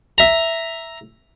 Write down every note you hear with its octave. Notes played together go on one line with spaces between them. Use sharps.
E5 A#5